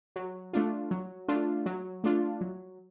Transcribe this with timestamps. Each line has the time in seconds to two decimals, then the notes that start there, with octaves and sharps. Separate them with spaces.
0.16 F#3
0.53 A3 D4 F4
0.91 F#3
1.28 A3 D4 F4
1.66 F#3
2.04 A3 D4 F4
2.41 F#3